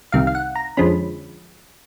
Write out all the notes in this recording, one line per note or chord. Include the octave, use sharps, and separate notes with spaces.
C2 C3 D#3 F5
F5
F#5
A#5
F2 D3 F3 G#3 C#4 B5